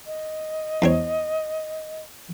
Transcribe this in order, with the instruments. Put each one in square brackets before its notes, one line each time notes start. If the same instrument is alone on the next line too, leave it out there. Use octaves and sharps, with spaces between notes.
[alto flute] D#5
[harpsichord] E2 C4 C#5